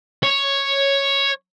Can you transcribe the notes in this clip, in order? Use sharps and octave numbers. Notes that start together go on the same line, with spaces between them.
C#5